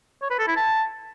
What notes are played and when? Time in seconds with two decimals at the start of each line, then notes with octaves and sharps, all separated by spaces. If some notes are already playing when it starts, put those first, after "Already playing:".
0.21 C#5
0.30 B4
0.39 A4
0.48 E4
0.56 A5